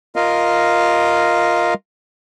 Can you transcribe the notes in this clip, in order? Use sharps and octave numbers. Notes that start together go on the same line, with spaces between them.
F4 A#4 D#5 F5